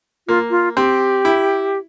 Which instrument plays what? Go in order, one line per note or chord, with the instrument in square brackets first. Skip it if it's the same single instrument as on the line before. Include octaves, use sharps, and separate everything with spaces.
[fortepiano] A#3 [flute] F4
[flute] F4
[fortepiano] C4 [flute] G4
[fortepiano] E4